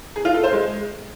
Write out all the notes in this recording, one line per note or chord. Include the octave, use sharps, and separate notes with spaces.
G#4
F4
A4
C5
G#3